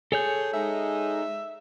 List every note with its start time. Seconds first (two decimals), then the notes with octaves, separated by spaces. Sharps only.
0.12 G#4 A4 C#5 G6
0.54 G#3 D#4 E5